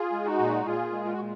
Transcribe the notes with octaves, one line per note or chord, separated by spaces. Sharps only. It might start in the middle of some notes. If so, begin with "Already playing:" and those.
Already playing: F4 G#4
G#3
D#4 F#4
A#2
A#2 F4 G#4
G#3
F4
F#4
A#2